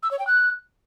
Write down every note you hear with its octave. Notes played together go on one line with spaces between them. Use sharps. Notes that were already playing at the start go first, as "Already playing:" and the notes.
E6
C#5
G5
F#6